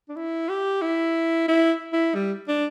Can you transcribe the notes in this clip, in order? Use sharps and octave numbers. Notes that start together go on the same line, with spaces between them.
D4
E4
G4
E4
E4
E4
G3
D4